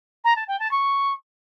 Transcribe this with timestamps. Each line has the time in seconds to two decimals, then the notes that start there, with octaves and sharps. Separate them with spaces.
0.24 A#5
0.36 A5
0.47 G5
0.59 A5
0.71 C#6